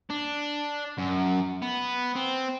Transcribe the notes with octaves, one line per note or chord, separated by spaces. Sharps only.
D4
F#2
B3
C4